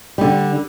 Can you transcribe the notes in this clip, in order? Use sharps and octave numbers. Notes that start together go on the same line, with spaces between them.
D3 G3